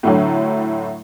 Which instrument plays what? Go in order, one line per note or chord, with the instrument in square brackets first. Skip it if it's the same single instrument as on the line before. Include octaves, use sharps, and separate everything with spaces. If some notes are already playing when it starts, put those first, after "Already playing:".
[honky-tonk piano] A2 D3 F#3